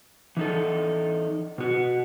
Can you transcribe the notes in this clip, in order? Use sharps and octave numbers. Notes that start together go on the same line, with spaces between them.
E3 D#4 A4
B2 F#4